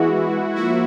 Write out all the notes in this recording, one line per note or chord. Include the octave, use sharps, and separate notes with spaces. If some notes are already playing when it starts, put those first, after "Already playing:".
Already playing: E3 G#3 B3 E4 F#4
F3 A#3 E4 F#4